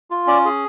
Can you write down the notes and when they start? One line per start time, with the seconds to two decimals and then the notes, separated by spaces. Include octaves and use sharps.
0.11 F4
0.27 C#4 D5
0.45 G#4